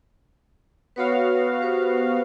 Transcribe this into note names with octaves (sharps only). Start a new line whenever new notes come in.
B3 F#4 B4 C#5 F5 B5
G4 B4 C5